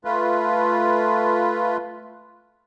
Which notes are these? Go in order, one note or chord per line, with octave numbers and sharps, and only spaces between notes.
A3 F4 B4